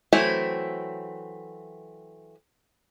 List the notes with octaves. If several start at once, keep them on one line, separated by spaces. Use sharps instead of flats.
E3 F#3 A3 C4 E4